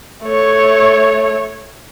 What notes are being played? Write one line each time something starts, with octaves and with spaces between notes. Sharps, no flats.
A3 C#5